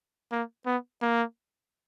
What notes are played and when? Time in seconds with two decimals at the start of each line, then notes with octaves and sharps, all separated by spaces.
0.32 A#3
0.66 B3
1.02 A#3